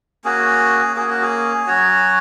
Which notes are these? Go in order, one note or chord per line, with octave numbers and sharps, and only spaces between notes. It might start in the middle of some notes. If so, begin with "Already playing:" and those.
A#3 C#4 F#4 G#4
A#3 C#4 F#4 G#4
F#4
G#4
F#3 C#4 F#4 C#5